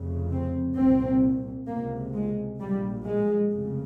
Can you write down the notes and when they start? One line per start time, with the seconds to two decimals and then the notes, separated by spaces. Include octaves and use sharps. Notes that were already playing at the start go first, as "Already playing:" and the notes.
Already playing: F1 F2 C#3
0.31 C4
0.77 C2 A#2 C4
1.68 C#2 C3 A#3
2.14 G#3
2.60 A#1 A#2 G3
3.05 G#3
3.51 F1 F2 C#3